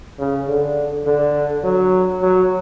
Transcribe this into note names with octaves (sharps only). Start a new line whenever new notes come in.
C#3
D3
D3
F#3
F#3